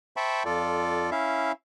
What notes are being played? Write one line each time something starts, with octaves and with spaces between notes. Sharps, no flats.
C5 E5 G5 A5 B5 C#6
F2 F4 A4 D5
C#4 E4 E5 F5